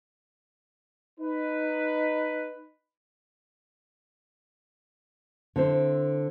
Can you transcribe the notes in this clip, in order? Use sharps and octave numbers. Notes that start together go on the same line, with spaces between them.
D#4 B4
D3 C4 E4 C5